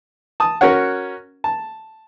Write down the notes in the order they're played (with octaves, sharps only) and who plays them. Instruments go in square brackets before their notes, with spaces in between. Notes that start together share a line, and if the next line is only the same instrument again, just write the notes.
[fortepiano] A5 D#6
C#4 F#4 A#4 C#5 F#5
A5